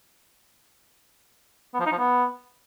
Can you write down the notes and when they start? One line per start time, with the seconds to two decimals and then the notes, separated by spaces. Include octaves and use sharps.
1.74 B3
1.80 F3
1.86 D#4
1.92 F3
1.98 B3